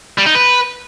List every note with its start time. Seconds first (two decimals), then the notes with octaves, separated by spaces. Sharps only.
0.18 G3
0.26 D#4
0.35 B4